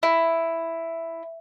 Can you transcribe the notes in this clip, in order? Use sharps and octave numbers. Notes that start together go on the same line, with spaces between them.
E4